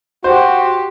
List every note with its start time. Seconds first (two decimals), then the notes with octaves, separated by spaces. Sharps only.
0.24 F#4 G4 C5